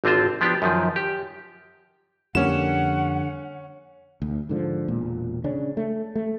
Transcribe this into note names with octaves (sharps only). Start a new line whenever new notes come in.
G#1 D3 C4 F4 C5
F3 B3 D4 G4
F#2 D#3 F3
G4
F2 D3 G3 A#3 C#4 F#5 E7
D2
G#2 D3 F3
E1 A#2
C#3 C#4 D4
A3
A3